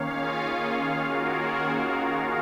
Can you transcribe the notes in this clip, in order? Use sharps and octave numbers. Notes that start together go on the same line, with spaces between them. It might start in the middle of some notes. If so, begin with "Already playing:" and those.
Already playing: D#3 A#3 C#4 C#5 F5
F4 G#4
F#4 A#4